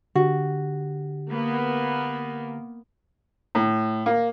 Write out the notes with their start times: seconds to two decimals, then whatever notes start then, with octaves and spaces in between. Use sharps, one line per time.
0.15 D3 F#4 G4
1.28 A#3 B3
3.55 A2
4.06 A#3